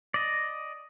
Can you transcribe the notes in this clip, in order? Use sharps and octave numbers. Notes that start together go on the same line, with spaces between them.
D5 D#5